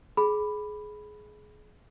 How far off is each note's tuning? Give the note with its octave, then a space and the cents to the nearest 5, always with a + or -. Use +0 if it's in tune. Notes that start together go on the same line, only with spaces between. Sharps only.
G#4 +25 B5 +0